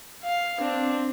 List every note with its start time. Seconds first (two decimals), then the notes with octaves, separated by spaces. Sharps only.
0.23 F5
0.58 C4 D4